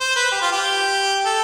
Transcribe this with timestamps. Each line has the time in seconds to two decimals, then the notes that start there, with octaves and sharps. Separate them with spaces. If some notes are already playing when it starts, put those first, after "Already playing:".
0.01 C5
0.16 B4
0.31 G4
0.42 F4
0.52 G4
1.25 A4